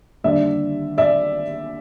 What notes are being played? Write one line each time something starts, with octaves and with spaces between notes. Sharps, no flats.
D#2 D3 G3 D5 E5
D5 E5